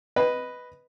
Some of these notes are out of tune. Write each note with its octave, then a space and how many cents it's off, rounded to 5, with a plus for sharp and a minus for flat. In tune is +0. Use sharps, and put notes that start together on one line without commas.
B4 +0 D#5 +0